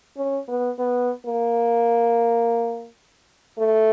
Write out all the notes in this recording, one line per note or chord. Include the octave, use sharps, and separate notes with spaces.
C#4
B3
B3
A#3
A3